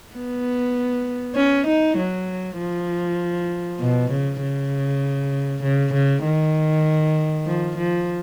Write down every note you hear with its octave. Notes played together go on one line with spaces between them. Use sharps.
B3
C#4
D#4
F#3
F3
B2
C#3
C#3
C#3
C#3
D#3
F3
F3